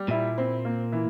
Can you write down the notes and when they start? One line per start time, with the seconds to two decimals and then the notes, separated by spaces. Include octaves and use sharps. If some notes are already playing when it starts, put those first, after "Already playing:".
Already playing: G3
0.08 A#2 E4
0.38 C4
0.65 A#3
0.92 E3